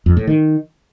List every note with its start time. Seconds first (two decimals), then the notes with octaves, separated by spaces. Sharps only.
0.06 F2
0.17 A2
0.27 D#3